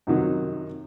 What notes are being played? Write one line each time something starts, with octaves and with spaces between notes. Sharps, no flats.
F#2 C3 D#3 F#3